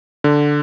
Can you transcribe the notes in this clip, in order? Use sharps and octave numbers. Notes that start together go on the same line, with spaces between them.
D3